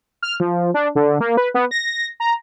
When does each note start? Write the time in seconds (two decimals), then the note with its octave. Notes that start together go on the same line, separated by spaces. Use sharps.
0.23 F6
0.40 F3
0.74 D4
0.95 D3
1.20 A#3
1.37 B4
1.54 B3
1.71 A#6
2.20 A#5